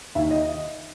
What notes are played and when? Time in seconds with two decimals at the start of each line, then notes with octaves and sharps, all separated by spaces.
0.15 D#2 D#3 E5
0.31 D#5